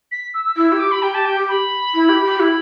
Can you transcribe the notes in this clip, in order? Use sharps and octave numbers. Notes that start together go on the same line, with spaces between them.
B6
E6
E6
E4 E6
G4 E6
D6
B5
G4 G5
A5
G5
B5
E4
G4
G4
E4 B5